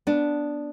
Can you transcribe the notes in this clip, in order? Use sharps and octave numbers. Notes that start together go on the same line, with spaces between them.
B3 D4